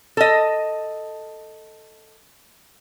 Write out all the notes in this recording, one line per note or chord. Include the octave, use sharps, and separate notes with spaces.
A4 D#5